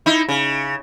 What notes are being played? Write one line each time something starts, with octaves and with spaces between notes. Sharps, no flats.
D#4 E4
C#3